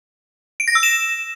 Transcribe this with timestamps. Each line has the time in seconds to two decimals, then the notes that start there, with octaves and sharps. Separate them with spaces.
0.60 D7
0.68 A#6
0.75 E6
0.83 E7